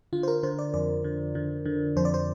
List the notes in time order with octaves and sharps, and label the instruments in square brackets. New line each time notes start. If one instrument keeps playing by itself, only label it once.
[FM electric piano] D3 F4
C5
A#4
D3 C5
D5
F2 D5
D3
D3
D3
F2 C5
D5
C5